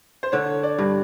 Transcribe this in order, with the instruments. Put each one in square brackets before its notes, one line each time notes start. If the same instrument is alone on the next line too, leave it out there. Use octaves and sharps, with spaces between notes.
[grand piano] C5
[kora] D3 [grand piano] C#5
[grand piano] D5
[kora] G2